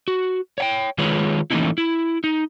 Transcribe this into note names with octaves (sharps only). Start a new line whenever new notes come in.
F#4
C#5 F#5 G5
D#3 G#3 F4 G#4 B4 C#5
E3 A3 A#3 C#4 D#4 E4
E4
D#4